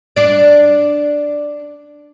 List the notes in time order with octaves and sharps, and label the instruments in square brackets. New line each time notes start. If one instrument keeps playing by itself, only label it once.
[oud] D4 D5